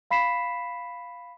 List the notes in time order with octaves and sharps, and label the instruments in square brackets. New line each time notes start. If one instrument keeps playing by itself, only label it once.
[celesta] F5 B5 B6 C7 E7